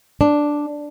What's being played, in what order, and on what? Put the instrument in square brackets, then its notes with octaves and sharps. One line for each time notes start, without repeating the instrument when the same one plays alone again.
[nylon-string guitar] D4